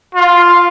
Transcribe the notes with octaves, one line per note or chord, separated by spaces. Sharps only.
F4